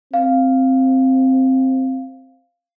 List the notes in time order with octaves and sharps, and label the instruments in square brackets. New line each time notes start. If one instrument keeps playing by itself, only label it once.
[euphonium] C4 [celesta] F5